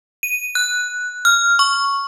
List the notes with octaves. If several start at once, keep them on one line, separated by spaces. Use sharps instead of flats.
D#7
F#6
F6
C#6